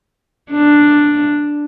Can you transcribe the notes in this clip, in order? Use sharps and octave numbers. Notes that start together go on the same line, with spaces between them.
D4